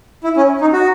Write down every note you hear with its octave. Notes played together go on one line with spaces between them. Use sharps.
E4
C#4
D#4
F#4